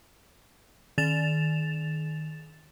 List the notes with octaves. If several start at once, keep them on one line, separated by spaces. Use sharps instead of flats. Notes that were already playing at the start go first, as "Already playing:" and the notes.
D#3 A6 E7 F7